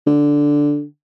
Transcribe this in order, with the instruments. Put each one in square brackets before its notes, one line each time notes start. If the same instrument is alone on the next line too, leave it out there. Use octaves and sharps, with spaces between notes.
[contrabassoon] D3